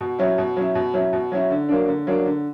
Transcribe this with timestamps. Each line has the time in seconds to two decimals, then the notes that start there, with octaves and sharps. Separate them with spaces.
0.01 B2
0.19 F#3 C#4 E4
0.38 B2
0.57 F#3 C#4 E4
0.75 B2
0.94 F#3 C#4 E4
1.13 B2
1.32 F#3 C#4 E4
1.50 D3
1.69 F#3 A#3 D4
1.88 D3
2.07 F#3 A#3 D4
2.26 D3